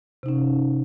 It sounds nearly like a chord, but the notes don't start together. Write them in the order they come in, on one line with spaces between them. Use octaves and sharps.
C3 D#4 C#4